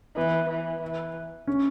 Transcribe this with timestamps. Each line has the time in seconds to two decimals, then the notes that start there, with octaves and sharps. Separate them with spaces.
0.16 E3 B3
0.50 E3
0.82 E3
1.47 C#4